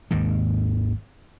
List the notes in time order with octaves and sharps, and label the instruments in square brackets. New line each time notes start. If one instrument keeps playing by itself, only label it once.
[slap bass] G#1 D#2 G#2 D#3